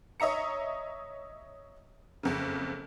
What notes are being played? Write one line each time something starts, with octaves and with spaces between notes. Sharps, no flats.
C#5 D#5 E5 A#5 C#7
F#1 F2 C#3